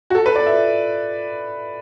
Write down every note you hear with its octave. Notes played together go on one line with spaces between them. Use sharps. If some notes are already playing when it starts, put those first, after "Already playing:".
F#4
A4
B4
D5
E5